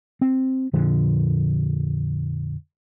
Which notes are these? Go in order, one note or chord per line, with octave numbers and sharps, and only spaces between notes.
C4
F2 A#2 D3 F3